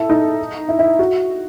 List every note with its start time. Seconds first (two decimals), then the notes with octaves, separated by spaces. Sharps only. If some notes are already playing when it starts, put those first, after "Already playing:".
Already playing: E4 A4
0.10 D#4
0.69 E4
0.79 E4
0.99 F#4